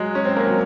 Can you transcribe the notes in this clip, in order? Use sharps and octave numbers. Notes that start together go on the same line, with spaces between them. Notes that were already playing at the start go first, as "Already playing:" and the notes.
Already playing: F#3 G#3
C#4
C4
A#3
F#3